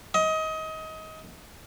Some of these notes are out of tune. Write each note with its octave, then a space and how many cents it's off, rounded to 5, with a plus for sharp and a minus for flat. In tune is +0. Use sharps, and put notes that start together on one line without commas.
D#5 +25